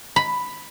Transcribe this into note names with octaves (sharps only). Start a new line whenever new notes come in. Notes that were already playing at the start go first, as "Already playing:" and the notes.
B5